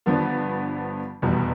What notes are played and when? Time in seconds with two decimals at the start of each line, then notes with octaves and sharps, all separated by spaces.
0.06 G1 G2 F3 B3 D4
1.22 F1 E2 B2 G3